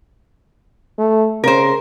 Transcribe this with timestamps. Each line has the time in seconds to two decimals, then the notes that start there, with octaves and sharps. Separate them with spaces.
0.98 A3
1.44 C#3 A#4 C5